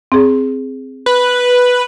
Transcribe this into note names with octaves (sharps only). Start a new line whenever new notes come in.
C4 G#4
B4